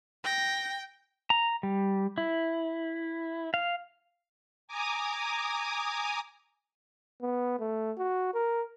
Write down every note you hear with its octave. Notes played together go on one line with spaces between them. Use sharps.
G5 A#6
A#5
G3
E4
F5
G#5 A#5 D6 D#6
B3
A3
F#4
A#4